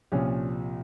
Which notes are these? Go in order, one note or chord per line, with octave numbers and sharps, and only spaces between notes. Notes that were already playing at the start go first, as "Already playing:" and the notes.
C2 A#2 F3 C#4